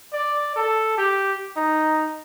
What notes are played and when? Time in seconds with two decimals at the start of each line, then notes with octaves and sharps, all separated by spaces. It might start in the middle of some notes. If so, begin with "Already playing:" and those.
0.13 D5
0.56 A4
0.98 G4
1.57 D#4